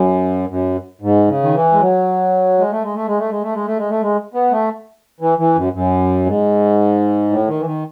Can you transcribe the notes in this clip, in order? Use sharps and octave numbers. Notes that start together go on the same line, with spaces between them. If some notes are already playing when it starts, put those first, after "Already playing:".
Already playing: F#2
F#2
G#2
C#3
D#3
E3
G#3
F#3
G#3
A3
G#3
A3
G#3
A3
G#3
A3
G#3
A3
G#3
A3
G#3
B3
A3
E3
E3
F#2
F#2
G#2
A2
D#3
E3
D#3